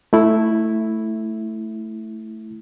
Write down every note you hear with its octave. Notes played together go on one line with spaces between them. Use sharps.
A3 E4